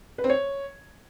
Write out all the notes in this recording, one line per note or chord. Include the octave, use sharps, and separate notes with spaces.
B4
C4
C#5